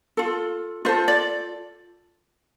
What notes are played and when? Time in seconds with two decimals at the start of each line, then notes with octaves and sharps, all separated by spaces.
0.17 F4 A4
0.85 F4 A4 C5 E5
1.08 D5